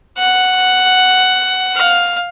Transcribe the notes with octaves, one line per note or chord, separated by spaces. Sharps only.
F#5
F5